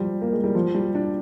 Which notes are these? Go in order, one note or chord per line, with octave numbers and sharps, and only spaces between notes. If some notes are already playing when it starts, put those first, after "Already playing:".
Already playing: F3 G3
A#3
G#3
G3
F3
G3
D4